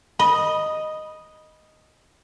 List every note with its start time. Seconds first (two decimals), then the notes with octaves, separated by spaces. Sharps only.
0.19 D#5 B5